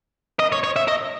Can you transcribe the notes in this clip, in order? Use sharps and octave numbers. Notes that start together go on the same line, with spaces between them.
D#5
C#5
C#5
E5
D#5